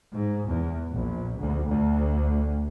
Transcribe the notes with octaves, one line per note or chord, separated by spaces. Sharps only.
G#2
E2
A#1
D2
D2